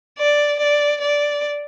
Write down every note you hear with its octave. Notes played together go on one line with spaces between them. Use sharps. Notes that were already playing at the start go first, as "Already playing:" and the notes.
D5
D5
D5